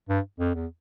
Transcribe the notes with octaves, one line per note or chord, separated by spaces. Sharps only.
G2
F2
E2